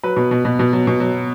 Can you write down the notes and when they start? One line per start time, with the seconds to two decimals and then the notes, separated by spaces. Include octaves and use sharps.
0.03 F#3 B4
0.16 B2
0.31 B2
0.45 B2
0.59 B2
0.73 F#3
0.87 B2
1.00 F#3